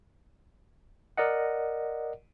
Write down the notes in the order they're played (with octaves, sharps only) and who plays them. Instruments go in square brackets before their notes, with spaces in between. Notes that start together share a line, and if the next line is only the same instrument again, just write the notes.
[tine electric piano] A#4 D5 D#5 F#5